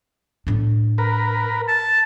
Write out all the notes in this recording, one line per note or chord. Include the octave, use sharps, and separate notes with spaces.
A2 D4
A#4 B4
A5